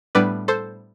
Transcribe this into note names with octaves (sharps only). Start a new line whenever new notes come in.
A2 G3 B3 D4 B4 D5
A4 C5